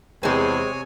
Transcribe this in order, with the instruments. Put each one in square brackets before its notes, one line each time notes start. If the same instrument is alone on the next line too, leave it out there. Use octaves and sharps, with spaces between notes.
[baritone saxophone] E2 [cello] C3 [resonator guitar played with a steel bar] G#3 C4 [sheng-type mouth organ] C#5 G#5